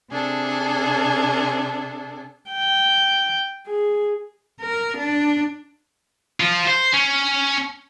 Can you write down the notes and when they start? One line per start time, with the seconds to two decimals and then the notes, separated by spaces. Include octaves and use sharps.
0.11 C3 D4 G#4 A4
2.51 G5
3.67 G#4
4.61 A#4
4.98 D4
6.40 F3 F4
6.68 C5
6.93 C#4